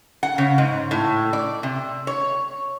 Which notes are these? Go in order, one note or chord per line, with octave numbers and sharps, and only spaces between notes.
F#5
C#3
G#2
A2
D5
C3
C#5